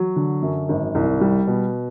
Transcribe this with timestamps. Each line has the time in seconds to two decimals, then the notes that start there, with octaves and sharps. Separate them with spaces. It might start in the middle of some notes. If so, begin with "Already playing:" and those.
Already playing: F#3
0.16 D3
0.42 F#2
0.69 G#1
0.95 C2
1.21 G3
1.47 B2